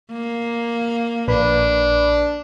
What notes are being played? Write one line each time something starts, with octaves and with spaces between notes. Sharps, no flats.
A#3
A#1 D4 B4 B5